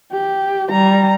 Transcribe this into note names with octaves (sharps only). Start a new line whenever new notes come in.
G4
G3 A#5